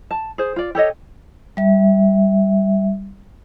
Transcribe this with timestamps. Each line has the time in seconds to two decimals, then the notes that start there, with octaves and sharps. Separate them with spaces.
0.11 A5
0.38 G#4 C5
0.56 F4 D5
0.75 G4 A4 C#5 D#5
1.57 G3 E5